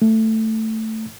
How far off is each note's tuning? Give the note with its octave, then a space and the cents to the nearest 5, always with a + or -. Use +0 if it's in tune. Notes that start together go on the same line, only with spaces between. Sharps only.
A3 +10